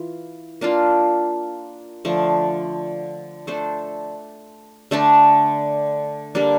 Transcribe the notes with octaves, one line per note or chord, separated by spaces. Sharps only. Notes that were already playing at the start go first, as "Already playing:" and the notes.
Already playing: E3 F4
A#3 D4 F4
D3 F3 A3
A3 D4 A4 C5
D3 A3 D4
D3 G3 A#3 D4